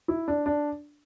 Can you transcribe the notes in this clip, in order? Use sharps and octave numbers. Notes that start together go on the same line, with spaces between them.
E4
D4
D4